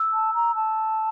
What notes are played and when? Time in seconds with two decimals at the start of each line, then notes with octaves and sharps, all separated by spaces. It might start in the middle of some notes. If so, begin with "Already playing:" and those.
Already playing: E6
0.13 A5
0.34 A#5
0.55 A5